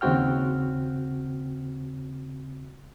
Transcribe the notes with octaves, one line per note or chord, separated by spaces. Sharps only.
D#2 C#3 C4 F#4 G5 F6